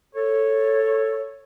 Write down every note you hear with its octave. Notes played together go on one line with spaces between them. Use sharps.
A4 C#5